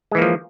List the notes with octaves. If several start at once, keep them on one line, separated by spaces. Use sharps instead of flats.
E3 F3 G#3 A#3